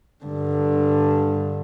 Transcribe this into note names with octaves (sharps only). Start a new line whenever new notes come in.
G2 D3